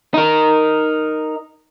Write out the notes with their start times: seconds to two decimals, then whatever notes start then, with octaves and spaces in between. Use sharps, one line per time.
0.14 D#4 A#4